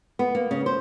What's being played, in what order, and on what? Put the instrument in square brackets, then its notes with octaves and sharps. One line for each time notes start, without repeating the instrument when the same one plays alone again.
[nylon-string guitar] B3
A#3
C#3
C5